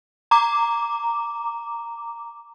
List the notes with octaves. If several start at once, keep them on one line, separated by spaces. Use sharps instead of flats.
A#5 D6